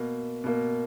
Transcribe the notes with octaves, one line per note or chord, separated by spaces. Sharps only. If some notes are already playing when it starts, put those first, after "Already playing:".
Already playing: B2 A#3
B2 A#3